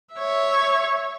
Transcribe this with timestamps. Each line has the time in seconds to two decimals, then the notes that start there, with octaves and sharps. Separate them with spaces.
0.14 C#5 E5